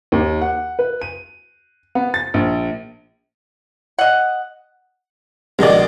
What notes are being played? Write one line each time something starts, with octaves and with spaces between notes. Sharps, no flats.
D#2
F#5
B4
D#7
B3
A6
A#1
D#5 F#5
A#1 B2 D#3 G#3 D5